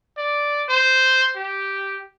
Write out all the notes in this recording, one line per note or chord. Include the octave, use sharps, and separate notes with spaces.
D5
C5
G4